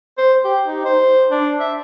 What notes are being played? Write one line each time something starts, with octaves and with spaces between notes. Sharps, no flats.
C5
G4
D#4
C5
D4
E5